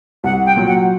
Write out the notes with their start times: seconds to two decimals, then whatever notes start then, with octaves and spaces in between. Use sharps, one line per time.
0.24 C2 F#5
0.46 G5
0.56 A#2 F#3
0.67 F#5